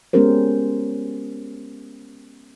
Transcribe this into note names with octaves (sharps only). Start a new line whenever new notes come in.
G#3 B3 C#4 G4 A#4 C5